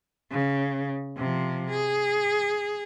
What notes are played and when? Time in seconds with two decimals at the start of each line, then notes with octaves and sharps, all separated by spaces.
0.31 C#3
1.17 C3 F3
1.70 G#4